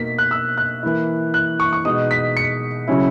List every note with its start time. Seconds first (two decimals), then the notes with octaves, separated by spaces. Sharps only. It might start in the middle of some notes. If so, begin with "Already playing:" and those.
Already playing: B2 A#3 D#4 B6
0.18 F#6
0.31 E6
0.57 F#6
0.83 E3 A#3 E4
1.34 F#6
1.60 C#6
1.73 C#6
1.85 B2 G#3 D#4 D#6
2.11 B6
2.37 C#7
2.88 C#3 F#3 C#4 E4